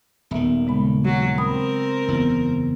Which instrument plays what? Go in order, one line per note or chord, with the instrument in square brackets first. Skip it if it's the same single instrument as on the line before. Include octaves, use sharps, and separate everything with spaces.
[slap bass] D#1 D#3 [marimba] B3 E5
[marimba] C#3 G#3 B5
[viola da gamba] F#3
[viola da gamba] C4 A#4 [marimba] G5 B5 D#6
[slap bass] F#1 E2 [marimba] B3